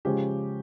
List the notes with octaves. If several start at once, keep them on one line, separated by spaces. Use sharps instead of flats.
C#3 F3 G#3 C#4 G4